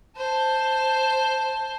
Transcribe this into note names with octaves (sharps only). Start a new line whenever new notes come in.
C5 A5